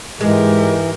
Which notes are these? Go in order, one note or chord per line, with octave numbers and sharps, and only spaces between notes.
G#2 E3 G#3 G4 A#4